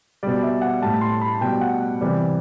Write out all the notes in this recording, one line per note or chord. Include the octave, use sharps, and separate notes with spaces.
B2 G3 D5
E5
F#5
A2 G3 A5
C6
B5
B2 G3 G5
F#5
C3 E3 G3 D5